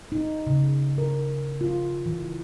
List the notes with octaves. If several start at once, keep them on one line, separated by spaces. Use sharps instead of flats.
D#4
C#3
A#4
F4
E3